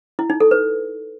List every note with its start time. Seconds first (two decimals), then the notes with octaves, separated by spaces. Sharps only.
0.19 E4
0.30 D#4
0.40 A4
0.51 B4